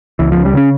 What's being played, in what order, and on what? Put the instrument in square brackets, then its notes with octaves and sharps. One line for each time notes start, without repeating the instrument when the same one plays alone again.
[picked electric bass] C#2 E3
F3
C#3
G3
C#3 C#4